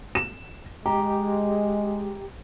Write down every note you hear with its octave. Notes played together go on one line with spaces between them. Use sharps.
E7
G#3 G4 A#5